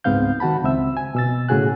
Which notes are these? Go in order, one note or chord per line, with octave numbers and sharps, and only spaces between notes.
C#2 G#2 B3 C4 F5 G6
D#3 F#4 F#5 A5 B5
C#2 C4 E5 E6
G#5
B2 E6 A6
A2 C#3 F#4 G#4 G#5 F#6